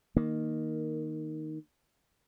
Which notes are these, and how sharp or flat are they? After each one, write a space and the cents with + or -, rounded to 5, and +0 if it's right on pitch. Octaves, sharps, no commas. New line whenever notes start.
D#3 +0 A#3 +0